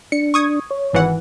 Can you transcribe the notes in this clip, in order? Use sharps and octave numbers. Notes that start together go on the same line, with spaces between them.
D4 C#7
C#6 D#6 G#6
C#5
G#1 E3 F#5